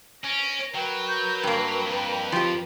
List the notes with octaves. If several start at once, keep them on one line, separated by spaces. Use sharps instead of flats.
C#4 A#6 D7
F#3 A#4 B4 G5
G6
G2 A#3 G5
F2
F3 G4